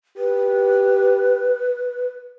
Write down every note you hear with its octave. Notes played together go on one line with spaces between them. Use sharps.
G4 B4